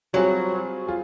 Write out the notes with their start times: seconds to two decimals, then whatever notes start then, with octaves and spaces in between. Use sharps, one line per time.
0.13 F#3 G3 C4 F4 G#4
0.87 F4 G#4